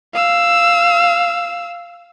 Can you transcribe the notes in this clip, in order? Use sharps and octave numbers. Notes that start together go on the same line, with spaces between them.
F5 E6